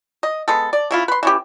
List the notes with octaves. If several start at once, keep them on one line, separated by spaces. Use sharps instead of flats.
D#5
G#3 B3 A4
D5
C#3 E4 F4
B4 C6
E3 C#4 G4